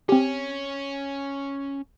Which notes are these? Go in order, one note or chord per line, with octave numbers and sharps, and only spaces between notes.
C4 C#4 G4